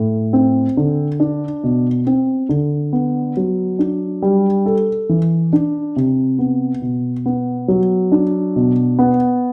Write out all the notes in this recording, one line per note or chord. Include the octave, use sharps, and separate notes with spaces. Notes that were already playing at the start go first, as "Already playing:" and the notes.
Already playing: A2
C4
D3
D4
B2
C4
D3
B3
F#3
D4
G3
A4
E3
D4
C3
B3
B2
B3
F#3
D4
B2
B3